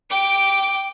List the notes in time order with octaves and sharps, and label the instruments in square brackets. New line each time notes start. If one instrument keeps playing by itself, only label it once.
[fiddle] G5 D6